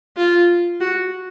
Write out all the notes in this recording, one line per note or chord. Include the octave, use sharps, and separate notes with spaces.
F4
F#4